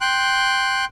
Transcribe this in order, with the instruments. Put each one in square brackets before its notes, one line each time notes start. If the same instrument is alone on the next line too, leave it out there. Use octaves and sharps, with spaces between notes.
[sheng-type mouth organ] G5 C6 F#6